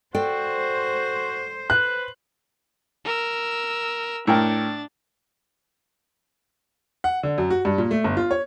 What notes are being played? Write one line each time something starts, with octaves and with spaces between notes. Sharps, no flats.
F#4 A4 C5 D5 G5
B4 F#6
A#4 E6
A2 D4 A#4 G5 A6
F#5
D3
F#2
F#4
G2
A#2
A3
G1
F4
C#5